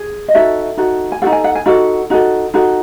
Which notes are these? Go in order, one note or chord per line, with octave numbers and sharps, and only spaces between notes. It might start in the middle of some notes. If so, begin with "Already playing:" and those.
Already playing: G#4
D#5
D#4 F#4 A4 E5
D#4 F#4 A4
G#5
D#4 F#4 A4 F#5
G#5
F#5
G#5
D#4 F#4 A4 F#5
D#4 F#4 A4
D#4 F#4 A4